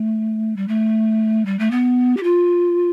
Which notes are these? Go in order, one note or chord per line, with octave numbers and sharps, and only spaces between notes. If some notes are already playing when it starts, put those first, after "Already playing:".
Already playing: A3
G3
A3
G3
A3
B3
G4
F4